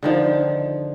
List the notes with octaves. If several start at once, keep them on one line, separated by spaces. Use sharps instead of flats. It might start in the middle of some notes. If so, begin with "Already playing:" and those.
D3 D#3 F3